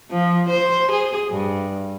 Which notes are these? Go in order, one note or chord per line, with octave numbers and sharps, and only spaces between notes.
F3
C5
G#4
G2